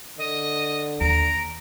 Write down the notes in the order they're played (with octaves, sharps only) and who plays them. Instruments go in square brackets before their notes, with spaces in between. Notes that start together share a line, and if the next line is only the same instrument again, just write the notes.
[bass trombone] D3 [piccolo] D#5
[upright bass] D#2 [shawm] A#5 [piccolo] D7